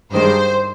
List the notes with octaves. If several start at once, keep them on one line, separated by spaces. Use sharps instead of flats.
G2 D#3 G#3 C5